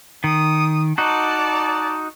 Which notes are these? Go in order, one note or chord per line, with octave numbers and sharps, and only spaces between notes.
D#3 D#6
D#4 F#4 D5 A5